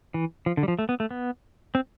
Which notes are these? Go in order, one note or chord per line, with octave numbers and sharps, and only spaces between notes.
E3
F3
D3
G3
F3
A3
B3
A3
B3
C4